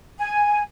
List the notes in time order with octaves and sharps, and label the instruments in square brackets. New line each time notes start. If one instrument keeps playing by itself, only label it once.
[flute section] G#5